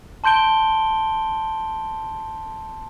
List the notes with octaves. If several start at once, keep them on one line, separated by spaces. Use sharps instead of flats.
A5 C6 G6 D7 G7